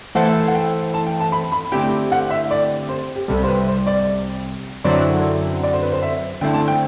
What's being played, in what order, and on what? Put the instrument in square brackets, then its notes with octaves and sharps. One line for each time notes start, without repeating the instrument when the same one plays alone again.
[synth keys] E3 A3 E4 A4 C5 [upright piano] F#5
[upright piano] F#5
G5
A5
G5
A5
B5
B5
[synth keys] D3 A3 C4 E4 G4 [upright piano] G5
[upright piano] F#5
E5
D5
C5
G4
[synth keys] C2 C3 G3 [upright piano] A4
[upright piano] C5
B4
C5
D5
[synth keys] F#2 D3 F#3 C4 E4 [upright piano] D5
[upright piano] D5
C5
B4
C5
E5
[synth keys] D3 A3 C4 E4 [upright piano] G5
[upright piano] A5
G5